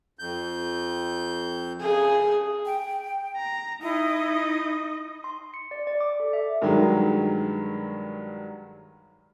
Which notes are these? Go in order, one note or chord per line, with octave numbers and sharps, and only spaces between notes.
F2 G6
C#3 G#4
G5
A#5
D#4 E4 D#5
C6
C#7
D5
D5
D6
A4
E5
G2 D#3 F#3 G#3